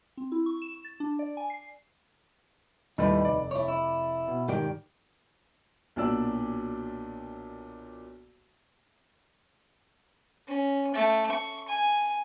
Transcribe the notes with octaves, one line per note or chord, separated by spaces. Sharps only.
C4
E4
C#6
E7
A6
D4
D5
G#5
C7
D#2 A2 G3 D#4 B4
F1 D5
E4 C#5
E4
B2
G#2 D#3 G4 D5
B1 A#2 F#3 D4 D5 E6
C#4
A3
C#6
G#5